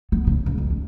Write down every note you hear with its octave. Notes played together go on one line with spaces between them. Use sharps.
B3
C#3
C#2
F2
D#2